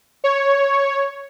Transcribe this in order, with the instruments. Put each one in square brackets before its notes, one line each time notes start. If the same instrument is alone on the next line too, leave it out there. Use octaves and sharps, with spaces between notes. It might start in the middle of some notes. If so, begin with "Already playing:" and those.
[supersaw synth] C#5